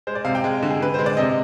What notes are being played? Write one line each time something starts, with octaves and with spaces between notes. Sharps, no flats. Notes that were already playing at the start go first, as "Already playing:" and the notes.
G#3 C5
D5
C3 F5
G5
G#3
D3
G#4
D3 B4
G#3 C5
D5
C3 D#5